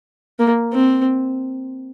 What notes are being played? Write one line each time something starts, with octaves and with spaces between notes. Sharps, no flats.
A#3
C4